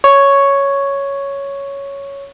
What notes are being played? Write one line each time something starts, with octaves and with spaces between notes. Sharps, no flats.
C#5 C#6